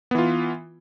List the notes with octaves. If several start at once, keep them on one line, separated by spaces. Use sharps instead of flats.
E3 B3 F4